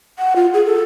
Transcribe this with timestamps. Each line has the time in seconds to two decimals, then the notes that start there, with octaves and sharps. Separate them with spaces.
0.19 F#5
0.36 F4
0.54 G#4
0.66 A4